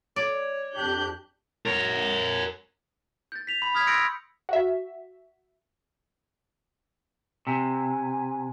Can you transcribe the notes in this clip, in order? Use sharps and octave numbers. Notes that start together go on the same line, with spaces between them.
C#5 D5
F2 D4 G4 F#6 G6
A#4 C#5
G6 A6
B6 F7
B5
D#6 F6 G#6 B6
C6 E6 G6 A#6 C#7 D7
F#4 E5
C3 G#5